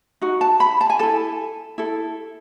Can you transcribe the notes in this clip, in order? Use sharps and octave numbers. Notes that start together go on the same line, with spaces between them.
D#4 F#4
A5
B5
A5
G#5
E4 A4 A5
E4 A4